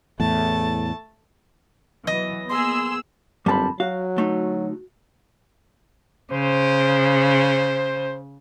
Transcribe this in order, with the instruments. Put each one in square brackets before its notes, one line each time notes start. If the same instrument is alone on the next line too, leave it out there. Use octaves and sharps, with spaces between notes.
[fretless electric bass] E2 A2 [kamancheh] A3 A5
[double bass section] E3 F#3 B3 [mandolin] D#5
[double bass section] A#3 B3 [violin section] G#4 E6 [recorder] C6
[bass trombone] G1 [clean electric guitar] F#2 A5 B5 [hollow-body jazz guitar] G3 C4
[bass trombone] F#3 [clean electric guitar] F#4 [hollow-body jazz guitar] F5
[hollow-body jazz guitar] D2 A3 D#4
[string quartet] C#3 [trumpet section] C5